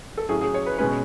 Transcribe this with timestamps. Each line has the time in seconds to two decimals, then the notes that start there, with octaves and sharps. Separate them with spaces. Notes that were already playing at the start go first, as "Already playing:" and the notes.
0.18 A4
0.29 A2 F#3 C#4 G#4
0.41 G#4
0.54 C#5
0.66 B4
0.78 B2 G#3 C#4 B4